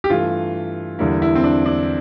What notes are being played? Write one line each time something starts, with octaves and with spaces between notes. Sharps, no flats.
G4
G2 E3 A3 F4
E2 D3 G3 A#3 E4
E4
C4
D4
D4